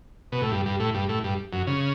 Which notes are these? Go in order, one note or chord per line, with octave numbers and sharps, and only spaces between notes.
B2
A2
G2
G2
A2
G2
A2
G2
F#2
C#3